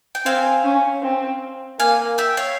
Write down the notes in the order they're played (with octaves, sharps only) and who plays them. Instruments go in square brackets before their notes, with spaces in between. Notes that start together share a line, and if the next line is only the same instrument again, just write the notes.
[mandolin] G5
[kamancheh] C4 [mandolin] F5 G#5
[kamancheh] C#4
C4
[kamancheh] A#3 [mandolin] F5 G#5
[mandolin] E5 G5
C#5 F5